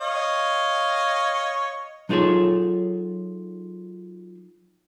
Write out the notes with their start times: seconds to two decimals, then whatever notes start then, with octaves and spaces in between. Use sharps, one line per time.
0.01 C#5 D#5 F5
2.09 F#3 D#4 F4 G#4 A4 C#5